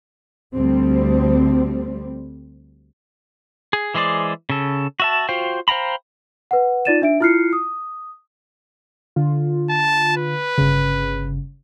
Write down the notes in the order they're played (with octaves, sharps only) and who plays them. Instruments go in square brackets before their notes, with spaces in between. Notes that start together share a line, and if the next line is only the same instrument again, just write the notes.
[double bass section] D2 G3 C4
[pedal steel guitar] G#4
E3 G#3 G#4 C5 D5
C#3 A4
F#4 E5 A5
F4 F#4 C5 F5 G5
C5 F5 G5 A#5 B5
[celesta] B4 F#5
D#4 F4 D5 A6 D#7 E7
D4 E5 D7
E4 F4 F6 F#6 C7 C#7
D#6
[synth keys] D3 F4
[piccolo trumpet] A5
B4
[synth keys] G1 C#3